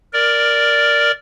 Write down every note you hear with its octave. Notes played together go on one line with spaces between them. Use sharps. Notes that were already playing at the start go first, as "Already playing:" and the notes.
A#4 D5